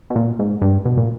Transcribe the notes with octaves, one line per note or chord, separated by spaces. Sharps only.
B2
A#2
G#2
G2
B2
A#2